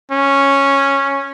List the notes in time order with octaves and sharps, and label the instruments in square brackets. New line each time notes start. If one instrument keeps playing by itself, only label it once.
[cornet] C#4